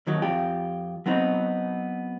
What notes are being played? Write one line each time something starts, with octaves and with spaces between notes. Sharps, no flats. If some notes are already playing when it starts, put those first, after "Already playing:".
D#2 D#3 F#3
F2 F4 G4
F#3 B3 C4 D#4